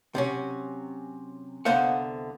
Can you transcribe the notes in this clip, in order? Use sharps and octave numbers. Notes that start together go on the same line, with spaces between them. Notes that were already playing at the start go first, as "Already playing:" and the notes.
C3 F#3 C#4
C2 D3 B3 C5 F5 F#5